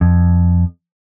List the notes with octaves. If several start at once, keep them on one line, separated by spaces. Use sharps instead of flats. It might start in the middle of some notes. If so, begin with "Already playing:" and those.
F2